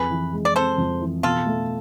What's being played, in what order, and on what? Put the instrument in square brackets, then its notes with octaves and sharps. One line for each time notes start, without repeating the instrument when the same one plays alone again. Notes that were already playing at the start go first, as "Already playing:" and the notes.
Already playing: [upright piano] F2 [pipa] G#4 B4
[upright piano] E3
G#3
[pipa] D5
[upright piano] C4 [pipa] A4 C5
[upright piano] F2
E3
[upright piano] B2 [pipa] F4 A4
[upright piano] A3